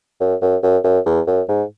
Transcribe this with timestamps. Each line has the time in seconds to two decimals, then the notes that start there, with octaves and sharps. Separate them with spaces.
0.20 F#2
0.41 F#2
0.63 F#2
0.84 F#2
1.06 E2
1.27 F#2
1.48 G#2